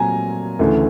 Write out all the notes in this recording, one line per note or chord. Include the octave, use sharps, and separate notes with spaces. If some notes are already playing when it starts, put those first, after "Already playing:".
Already playing: A#2 F#3 A3 C4 G#5 A#5
D2 C#3 E3 A3